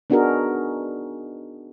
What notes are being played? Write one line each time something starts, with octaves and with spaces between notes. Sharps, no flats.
B3 D4 D#4 F#4 G#4 A#4